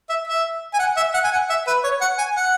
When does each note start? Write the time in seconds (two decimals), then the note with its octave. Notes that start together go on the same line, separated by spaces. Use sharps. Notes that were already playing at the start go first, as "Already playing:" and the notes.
0.09 E5
0.27 E5
0.74 G#5
0.79 F#5
0.97 E5
1.14 F#5
1.24 G#5
1.32 F#5
1.50 E5
1.67 B4
1.84 C#5
2.01 F#5
2.18 G#5
2.36 F#5